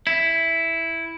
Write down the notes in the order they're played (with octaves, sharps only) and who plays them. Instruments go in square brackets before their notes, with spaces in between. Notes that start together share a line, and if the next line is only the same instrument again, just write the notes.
[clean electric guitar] E4